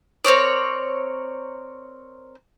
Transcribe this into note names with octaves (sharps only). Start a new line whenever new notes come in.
C4 A#4 C#5 D5